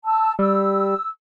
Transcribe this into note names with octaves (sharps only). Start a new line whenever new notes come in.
A5 E6
G3 E6